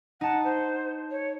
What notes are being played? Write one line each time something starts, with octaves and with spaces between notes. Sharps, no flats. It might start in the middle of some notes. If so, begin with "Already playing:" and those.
D#4 F#5 A5
C5
C#5